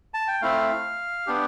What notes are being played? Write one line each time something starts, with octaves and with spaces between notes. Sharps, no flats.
A5
G5
A3 C4 E4 F5
B3 D4 G4